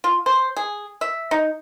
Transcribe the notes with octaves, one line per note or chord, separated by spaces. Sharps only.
F4
C5
G#4
E5
D#4